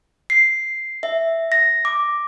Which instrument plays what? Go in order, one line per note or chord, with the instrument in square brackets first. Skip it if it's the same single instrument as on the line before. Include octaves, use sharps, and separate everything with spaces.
[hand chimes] C7
E5
A#6
D6